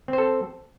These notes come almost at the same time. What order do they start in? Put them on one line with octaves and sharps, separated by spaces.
C4 C5 A4